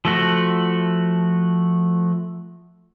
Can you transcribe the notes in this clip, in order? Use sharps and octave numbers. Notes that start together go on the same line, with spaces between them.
F3 A3 F#4